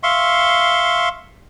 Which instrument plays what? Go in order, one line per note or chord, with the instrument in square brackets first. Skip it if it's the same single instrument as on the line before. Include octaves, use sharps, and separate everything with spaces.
[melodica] E5 F5 C6 C#6